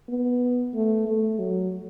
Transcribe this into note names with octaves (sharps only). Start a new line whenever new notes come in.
B3
A3
A3
F#3